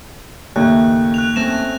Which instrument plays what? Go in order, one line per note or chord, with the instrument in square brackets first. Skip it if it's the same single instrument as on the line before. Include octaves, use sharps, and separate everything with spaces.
[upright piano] D#2 [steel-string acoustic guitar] A2 C#3 A3 [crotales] F#6
[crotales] F#6 F7
[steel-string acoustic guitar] A3 C4 C#4 [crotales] A#6 E7